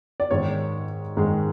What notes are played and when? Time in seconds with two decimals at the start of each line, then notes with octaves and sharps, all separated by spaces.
0.20 D5
0.31 G#2 D#3 G#3 C#5
1.17 G#2 D#3 G#3